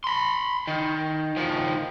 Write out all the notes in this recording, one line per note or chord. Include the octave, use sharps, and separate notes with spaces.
B5 C6
D#3
D#3 F3